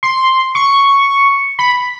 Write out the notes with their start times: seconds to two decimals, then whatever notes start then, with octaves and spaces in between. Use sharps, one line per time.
0.03 C6
0.55 C#6
1.59 B5